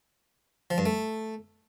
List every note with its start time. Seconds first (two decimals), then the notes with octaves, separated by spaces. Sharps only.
0.70 F3
0.78 G2
0.86 A3